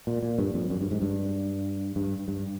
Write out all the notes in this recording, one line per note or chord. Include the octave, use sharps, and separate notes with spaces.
A#2
A#2
G2
F2
F#2
G2
G#2
G2
G2
G2